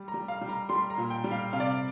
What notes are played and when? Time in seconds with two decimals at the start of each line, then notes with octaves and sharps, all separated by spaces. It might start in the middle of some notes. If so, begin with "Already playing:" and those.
Already playing: G3
0.08 A#5
0.14 G3
0.28 F5
0.41 G3
0.49 A#5
0.69 G3 C6
0.90 A#5
0.98 A#2
1.10 G5
1.24 G3
1.31 F5
1.53 C3 F5
1.60 D5
1.67 F5